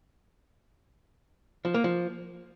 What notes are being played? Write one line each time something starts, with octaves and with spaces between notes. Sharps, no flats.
F3
A#3
F3